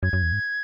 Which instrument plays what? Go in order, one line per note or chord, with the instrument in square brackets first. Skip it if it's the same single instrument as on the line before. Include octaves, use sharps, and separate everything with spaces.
[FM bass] F#2 [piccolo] G#6
[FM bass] F#2
E2
G#2